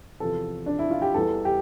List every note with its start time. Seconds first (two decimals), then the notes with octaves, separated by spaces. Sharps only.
0.20 E2 C3 F3 A4
0.66 D4
0.79 E4
0.91 F4
1.02 G4
1.14 E2 E3 G3 A4
1.45 G4